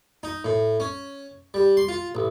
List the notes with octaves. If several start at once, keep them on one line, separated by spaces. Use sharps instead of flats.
D#4
A2
C#4
G3
C6
F4
A1